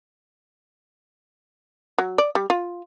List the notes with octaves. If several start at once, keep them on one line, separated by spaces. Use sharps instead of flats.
F#3
D5
G3
F4